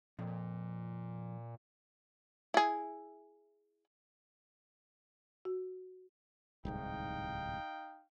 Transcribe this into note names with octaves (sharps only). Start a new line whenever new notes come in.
F2 A#2
E4 G#4
F#4
D1 C2 G#2 D#4 F5 G5